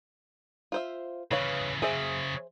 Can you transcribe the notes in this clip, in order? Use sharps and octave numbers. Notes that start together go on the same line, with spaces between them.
F4 C5 E5
C#3 E3 B4 C#5 F5
C#3 F#3 G#4 C5 E5